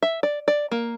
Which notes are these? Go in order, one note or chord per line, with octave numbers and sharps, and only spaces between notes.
E5
D5
D5
A#3